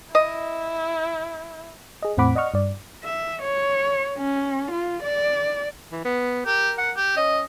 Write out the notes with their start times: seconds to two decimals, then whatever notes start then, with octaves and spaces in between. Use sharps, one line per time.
0.15 E4 D#5
2.03 G#4 D#5
2.17 E2 A2 C4 F#5 B5 D6
2.35 D5 D#5 F#5 C#6 F6
2.54 G2 D5
3.04 E5
3.42 C#5
4.18 C#4
4.71 F4
5.03 D5
5.92 E3
6.05 B3
6.46 G4 A#4
6.78 F#5
6.96 G4
7.17 C#4 D#5